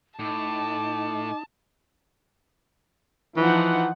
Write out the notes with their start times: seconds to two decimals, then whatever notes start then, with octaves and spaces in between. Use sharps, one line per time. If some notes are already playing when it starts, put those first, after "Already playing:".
0.19 A2 D#4 A5 D6
3.37 E3 F3 D#4 F#5